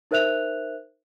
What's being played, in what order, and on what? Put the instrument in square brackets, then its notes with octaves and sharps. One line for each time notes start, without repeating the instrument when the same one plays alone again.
[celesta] D#4 A#4 C5 E5 F#6 F7